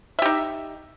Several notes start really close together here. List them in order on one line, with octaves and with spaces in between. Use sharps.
E5 G4 D#4